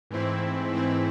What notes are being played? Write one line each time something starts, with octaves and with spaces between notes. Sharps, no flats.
G#2 E3 A3 C4 E4
G#2 E3 A3 C4 E4